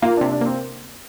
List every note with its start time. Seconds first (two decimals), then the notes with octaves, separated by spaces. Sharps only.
0.02 A#3 F4
0.17 C3 D4
0.32 D4
0.41 A#3 C4